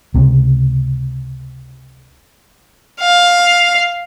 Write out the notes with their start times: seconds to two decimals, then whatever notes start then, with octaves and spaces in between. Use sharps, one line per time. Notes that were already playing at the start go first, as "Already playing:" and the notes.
0.14 C#2 C3
3.01 F5